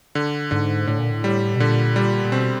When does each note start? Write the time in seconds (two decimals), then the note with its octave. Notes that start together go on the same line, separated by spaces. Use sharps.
0.15 D3
0.51 G#2 D3
0.87 A2 D3
0.99 A#2
1.10 A2
1.24 G3
1.55 B2
1.60 A#2 D3
1.96 G3
2.25 A#2
2.32 B2 C4